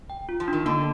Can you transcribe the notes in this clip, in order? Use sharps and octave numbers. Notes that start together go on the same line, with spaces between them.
G5
F4
F3
D#3 D4
D3 A#3